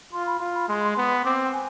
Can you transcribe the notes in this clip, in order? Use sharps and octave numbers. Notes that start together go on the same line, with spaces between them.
F4 C6
B5
F4
B5
G#3 C6
C6
B3
C4 D6
C6
G#5